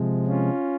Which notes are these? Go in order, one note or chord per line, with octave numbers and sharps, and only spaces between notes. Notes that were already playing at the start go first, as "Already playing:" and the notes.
Already playing: C3 F3 G#3
C#4 F4